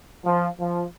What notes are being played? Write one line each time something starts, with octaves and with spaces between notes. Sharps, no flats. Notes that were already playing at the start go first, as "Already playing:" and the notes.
F3
F3